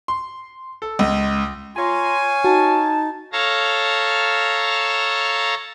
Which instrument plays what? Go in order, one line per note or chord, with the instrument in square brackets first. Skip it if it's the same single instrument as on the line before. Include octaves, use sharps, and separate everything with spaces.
[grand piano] C6
A4
C#2
[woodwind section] F4 A#5 C6 [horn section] C#5 F5 G#5
[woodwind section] D#4 A5 [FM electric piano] F#4
[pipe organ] A4 C#5 F5 A5 A#5